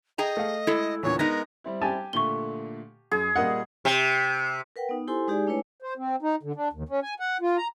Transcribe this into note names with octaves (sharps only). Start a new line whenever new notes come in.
G#4 D#5 G5 A#5
A3 F5
G#3 E4 A4
E2 A#2 D3 C#5
G#3 B3 D#4 A#4 A#6
G3 C4 E4
G4 G#5 A5
A#2 D3 A3 C#6 G7
F#2 G#4
A#2 G3 A#3 D#5 F#5
C3
A#4 B4 F#5 G5
B3 D#4
E4 G4 A4 C5 G#5 C6
G#3 D#4 G4 G#4 D5 G#5
A3 D4 E4 B4 C#5 G#5
C5
C4
D#4
D3
D4
D#2
C#4
G#5
F#5
F4
A#5